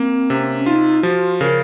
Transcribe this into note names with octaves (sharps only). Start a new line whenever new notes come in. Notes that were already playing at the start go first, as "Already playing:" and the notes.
Already playing: A#3 C4
C3 C#4
D#4 F4
F3 F#4
C#3 A#4